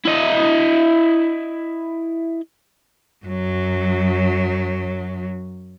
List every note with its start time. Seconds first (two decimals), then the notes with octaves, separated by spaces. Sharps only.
0.05 E4 D#5
3.25 F#2 F#3